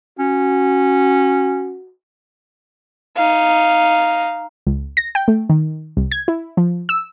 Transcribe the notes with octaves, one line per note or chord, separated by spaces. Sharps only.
C#4 F#4
D#4 F5
C#2
A#6
G5
A3
D#3
C2
G#6
E4
F3
E6